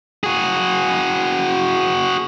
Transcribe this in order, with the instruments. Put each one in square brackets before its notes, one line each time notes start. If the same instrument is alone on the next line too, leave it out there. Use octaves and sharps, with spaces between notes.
[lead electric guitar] F#4 G#4